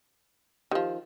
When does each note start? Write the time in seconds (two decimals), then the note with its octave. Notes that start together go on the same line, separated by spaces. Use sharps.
0.71 D#3 F3 G4